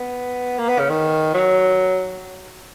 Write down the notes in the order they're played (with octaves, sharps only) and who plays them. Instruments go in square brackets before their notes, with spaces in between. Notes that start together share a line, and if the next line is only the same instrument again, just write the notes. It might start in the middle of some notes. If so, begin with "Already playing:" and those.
Already playing: [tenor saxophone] B3
A#3
B3
C#3
D#3
F#3